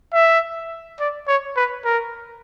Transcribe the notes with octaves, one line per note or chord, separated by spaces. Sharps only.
E5
D5
C#5
B4
A#4